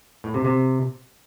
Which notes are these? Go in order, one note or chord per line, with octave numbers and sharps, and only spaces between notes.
A2
C3
C3